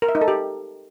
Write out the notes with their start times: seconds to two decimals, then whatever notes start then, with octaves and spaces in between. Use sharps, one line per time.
0.02 A#4
0.09 E5
0.15 D#4
0.21 A4
0.28 G4